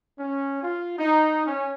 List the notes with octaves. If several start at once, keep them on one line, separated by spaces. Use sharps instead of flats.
C#4
F4
D#4
C#4